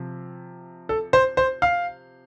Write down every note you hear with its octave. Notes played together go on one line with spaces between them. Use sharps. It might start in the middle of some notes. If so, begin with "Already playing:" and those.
Already playing: C3 F3
A4
C5
C5
F5